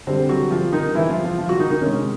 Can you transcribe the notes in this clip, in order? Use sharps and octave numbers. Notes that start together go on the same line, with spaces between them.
D3 G3 C4 C5
F#3 F#4
F3 F4
D#3 D#4
E3 E4
F3 F4
F3 F4
F3 F4
F#3 F#4
D#3 D#4
D#3 D#4
C3 D#3 G#3 C#4